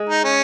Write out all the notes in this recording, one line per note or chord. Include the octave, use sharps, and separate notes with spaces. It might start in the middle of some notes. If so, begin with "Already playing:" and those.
Already playing: G#3
D#4
C#4